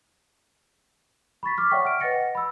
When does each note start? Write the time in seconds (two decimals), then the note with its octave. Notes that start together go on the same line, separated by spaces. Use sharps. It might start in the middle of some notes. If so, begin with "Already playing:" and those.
1.43 B5 C#6 A6 B6
1.57 D6 F6 B6
1.71 C#5 D5 E5 F#5 G5 C#6
1.85 F6 D7
2.00 B4 D#5 F#5 A6 A#6 C#7
2.35 B5 E6